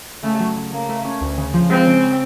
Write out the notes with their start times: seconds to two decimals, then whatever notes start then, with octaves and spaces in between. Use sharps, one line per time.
0.23 C#3 A3
0.40 F#3
0.56 C#3
0.72 C#3 A#3
0.89 A3
1.05 C#4
1.21 D2
1.38 C#3
1.54 F3
1.70 G#3 C4
1.87 C#3